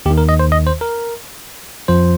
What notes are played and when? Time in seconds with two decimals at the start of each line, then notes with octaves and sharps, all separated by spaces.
0.06 D#2 G4
0.11 D#3
0.18 A#4
0.29 D#5
0.39 C5
0.52 D#5
0.67 C5
0.81 A#4
1.88 F2 F3 C5